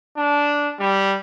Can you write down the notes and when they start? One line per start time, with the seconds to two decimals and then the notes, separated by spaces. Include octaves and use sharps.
0.17 D4
0.80 G3